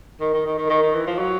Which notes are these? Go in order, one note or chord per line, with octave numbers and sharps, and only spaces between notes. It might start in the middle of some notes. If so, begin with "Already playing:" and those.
D#3
D#3
D#3
D#3
D#3
D#3
E3
F3
F#3